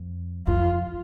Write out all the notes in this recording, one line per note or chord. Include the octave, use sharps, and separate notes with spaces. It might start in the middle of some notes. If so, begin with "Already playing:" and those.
Already playing: F2
F2 F4